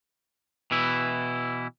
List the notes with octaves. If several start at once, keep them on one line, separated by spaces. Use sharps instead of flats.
B2 E3 E4